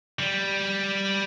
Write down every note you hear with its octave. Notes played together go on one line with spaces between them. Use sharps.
G3